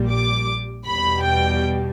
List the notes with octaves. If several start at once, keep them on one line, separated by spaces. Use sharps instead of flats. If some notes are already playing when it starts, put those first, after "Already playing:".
Already playing: A#1 A#2 G3
D6
E2 B2 G3 B5
G5